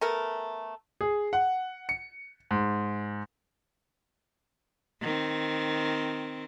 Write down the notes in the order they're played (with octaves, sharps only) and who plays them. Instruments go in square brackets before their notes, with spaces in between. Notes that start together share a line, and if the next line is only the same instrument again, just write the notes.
[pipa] A3 B3 A#4 G#5
[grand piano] G#4
F#5
C#7
G#2
[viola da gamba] D#3 C4